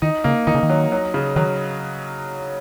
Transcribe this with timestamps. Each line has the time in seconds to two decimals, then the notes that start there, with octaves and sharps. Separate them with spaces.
0.02 D#3 D#4
0.24 C#3 A#3
0.47 D#3 D#4
0.54 C#3
0.63 D#3
0.70 F#3
0.92 F#3
1.14 C#3
1.36 D#3 F#3